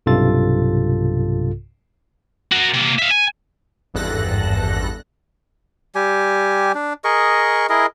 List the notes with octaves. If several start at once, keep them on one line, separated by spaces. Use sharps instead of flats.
B1 G2 C3 F4 A4 A6
F#4 A#4
C3 A#3
E5 F5
G#5
G#1 E2 G2 A4 F#6 A#6
G3 G4 G#5
D4
G#4 A#4 D#5 C#6
E4 G#4 A#4 D#5